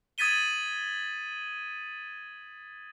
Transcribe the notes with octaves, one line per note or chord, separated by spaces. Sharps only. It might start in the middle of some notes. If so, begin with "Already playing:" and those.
D#6 G#6 A6 B6 D#7 G7